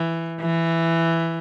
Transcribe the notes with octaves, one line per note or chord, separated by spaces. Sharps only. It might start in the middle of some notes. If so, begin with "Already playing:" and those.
Already playing: E3
E3